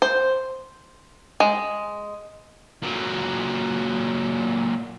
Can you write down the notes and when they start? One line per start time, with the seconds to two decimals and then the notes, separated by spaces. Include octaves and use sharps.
0.02 C5
1.40 G#3
2.83 A#2 F#3